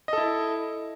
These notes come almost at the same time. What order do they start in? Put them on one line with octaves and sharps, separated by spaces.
D#5 A4 E4